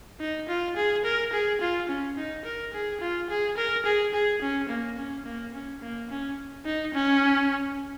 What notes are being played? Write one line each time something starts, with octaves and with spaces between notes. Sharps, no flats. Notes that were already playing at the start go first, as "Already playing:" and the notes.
D#4
F4
G#4
A#4
G#4
F4
C#4
D#4
A#4
G#4
F4
G#4
A#4
G#4
G#4
C#4
A#3
C#4
A#3
C#4
A#3
C#4
D#4
C#4